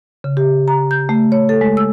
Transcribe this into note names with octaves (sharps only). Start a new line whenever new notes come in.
C#3
G4
A#5
G6
A3
C#5
A4
G#3
E6